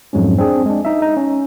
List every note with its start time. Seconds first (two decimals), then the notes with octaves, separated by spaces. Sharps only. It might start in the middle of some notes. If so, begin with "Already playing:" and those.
0.13 F2 G#2 F#3 G#3 C#4
0.38 C4 D4 G#4
0.66 G#3 D4
0.85 D#4 E5
1.02 D#4
1.17 C#4